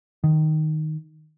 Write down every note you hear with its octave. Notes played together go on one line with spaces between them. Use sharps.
D#3